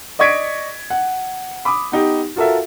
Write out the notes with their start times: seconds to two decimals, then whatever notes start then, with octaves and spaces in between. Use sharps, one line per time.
0.19 D5 D#5 C#6 G#6 B6 D7
0.90 F#5
1.65 B5 D6 D#6
1.92 B3 D#4 G4
2.36 F4 F#4 A4 A#4 E5